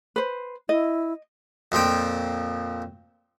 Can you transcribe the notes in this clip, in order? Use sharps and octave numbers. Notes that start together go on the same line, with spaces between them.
B4 C5
E4 D#5
F2 A#2 F3 G5